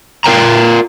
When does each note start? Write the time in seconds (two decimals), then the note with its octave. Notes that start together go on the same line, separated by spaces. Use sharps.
0.24 F4 A#4 G5 A#5